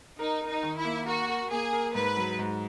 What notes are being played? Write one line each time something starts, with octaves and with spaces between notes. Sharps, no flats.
D#4 A#4
A#4
D#4
D#3
E4
A#3
F#4 A#4
A#4
A#3 G#4
A#4
G#2 B4
F#3
G#2